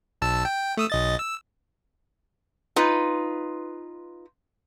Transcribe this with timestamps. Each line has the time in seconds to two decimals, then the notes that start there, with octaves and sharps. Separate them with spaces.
0.22 B1 A5 E6
0.45 G5
0.77 A3 D#6 E6
0.90 B1 D#5 A6
1.19 E6
2.76 D#4 F4 B4